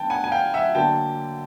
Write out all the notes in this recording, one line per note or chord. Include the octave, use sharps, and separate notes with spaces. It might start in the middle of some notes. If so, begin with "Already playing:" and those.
Already playing: D#3 B3 G5 A5
F#5 G#5
G#5
F5 G5
E5 F#5
D3 F#3 A#3 G5 A5